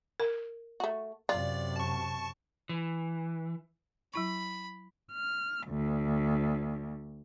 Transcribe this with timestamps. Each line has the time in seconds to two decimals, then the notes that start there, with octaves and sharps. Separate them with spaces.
0.20 A#4
0.80 A3 F#4
1.29 F#2 C3 F4 D5
1.76 A5 C#6
2.69 E3
4.14 F#3 E4 B5 C#6
5.13 F6
5.69 D2